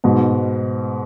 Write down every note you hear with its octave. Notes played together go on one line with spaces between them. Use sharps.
G#2 B2